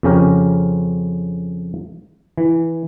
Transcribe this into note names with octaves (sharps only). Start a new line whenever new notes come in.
F2 C#3 C#4 G4 A#4
E3